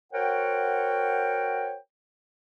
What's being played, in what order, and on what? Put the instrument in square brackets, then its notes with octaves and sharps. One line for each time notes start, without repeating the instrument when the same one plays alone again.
[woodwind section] F#4 A#4 C5 C#5 F#5 G5